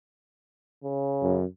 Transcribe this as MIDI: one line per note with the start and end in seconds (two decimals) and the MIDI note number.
0.84 1.40 49
1.22 1.45 42